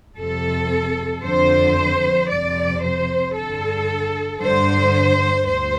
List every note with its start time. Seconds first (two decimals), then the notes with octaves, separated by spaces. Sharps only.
0.18 F2 C3 A4
1.23 F2 D3 C5
2.29 F2 C3 D5
2.82 C5
3.34 G2 D3 A4
4.40 G2 D3 C5
5.45 D2 C5